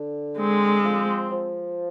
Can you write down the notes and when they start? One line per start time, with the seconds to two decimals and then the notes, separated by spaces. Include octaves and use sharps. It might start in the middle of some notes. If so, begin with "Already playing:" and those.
Already playing: D3
0.38 G#3 C4
0.84 F3
1.31 F3